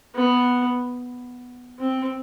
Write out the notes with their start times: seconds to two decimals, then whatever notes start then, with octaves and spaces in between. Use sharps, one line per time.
0.15 B3
1.79 C4